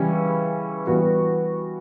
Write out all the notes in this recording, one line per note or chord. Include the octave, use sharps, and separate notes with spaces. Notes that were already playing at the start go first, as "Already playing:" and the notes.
Already playing: C#3 E3 G3 C#4 E4
E3 G3 B3 F#4